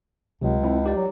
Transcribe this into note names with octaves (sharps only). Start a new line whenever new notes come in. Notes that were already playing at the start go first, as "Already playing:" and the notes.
C#2 C3 F#3
C4 E4
D#4 G4 D5
F#3